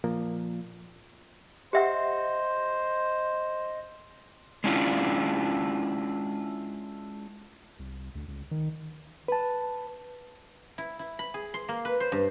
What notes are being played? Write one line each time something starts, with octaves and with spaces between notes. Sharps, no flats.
A#2 F3 A#3
G4 C5 D#5 E5 F#5
G#3 C#4 D4 E4 F4
C2
D2
C#2
D#3
B4 A5
E4
E4
B5
G#4
C6
A#3
B4
C5
G2